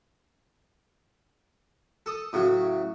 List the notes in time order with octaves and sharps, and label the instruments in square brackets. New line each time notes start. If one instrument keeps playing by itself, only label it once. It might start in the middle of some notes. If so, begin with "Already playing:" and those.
[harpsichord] A4 D#6
A2 C#3 F#3